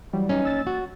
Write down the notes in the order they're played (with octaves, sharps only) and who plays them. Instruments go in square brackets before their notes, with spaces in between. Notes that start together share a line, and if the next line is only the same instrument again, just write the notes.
[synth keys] E3 F#3 G3
[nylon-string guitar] C#4 D#4
[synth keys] A#1 E6 A6
[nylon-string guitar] F#4